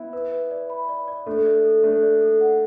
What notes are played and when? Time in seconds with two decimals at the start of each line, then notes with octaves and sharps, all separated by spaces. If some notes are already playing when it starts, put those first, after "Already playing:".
Already playing: B3 E4
0.13 B4
0.31 B4
0.51 D5
0.70 B5
0.89 D5
1.08 D5
1.26 A3 D4 A4
1.45 D5
1.64 A4
1.83 A3 D4 A4
2.03 D5
2.21 A4
2.41 F#5